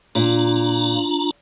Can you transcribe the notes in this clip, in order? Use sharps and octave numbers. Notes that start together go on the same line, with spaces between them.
A#2 D4 F4 A#5